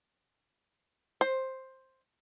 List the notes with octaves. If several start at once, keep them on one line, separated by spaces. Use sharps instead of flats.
C5